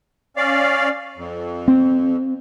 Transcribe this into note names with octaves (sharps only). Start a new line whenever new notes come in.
C#4 D5 F5
F2
C4